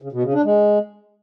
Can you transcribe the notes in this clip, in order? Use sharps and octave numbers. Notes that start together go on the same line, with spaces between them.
C#3
B2
C#3
D4
G#3